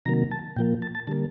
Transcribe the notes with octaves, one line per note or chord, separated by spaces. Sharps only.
C3 D#3 F#3 A#3 A#5
A5
A#2 F3 A#3 G5
A5
A5
D3 G3 A#3 A5